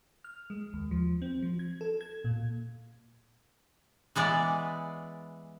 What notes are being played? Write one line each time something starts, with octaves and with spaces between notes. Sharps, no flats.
F6
G#3
D#2
F3
C4
F3
G#6
A4
G#6
A#2
E3 G#3 B3 D5